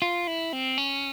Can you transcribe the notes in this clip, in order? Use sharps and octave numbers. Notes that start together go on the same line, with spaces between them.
F4
E4
C4
C#4